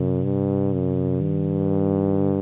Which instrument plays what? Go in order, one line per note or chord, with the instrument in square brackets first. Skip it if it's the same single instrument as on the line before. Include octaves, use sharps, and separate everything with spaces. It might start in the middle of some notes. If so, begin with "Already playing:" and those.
Already playing: [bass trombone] F#2 [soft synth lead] C3
[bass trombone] G2
F#2
[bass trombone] G2 [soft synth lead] D#3
[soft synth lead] D3